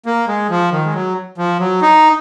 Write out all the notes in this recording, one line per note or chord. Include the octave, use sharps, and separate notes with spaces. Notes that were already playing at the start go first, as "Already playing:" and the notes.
A#3
G#3
F3
D#3
G#3
F#3
F3
F#3
D#4